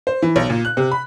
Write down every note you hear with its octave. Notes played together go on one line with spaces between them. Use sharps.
C5
E3
B1
A#2
F#6
C3
B5